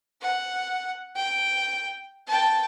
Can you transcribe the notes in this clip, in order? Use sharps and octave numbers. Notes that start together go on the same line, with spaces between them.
F#5
G5
G5 A5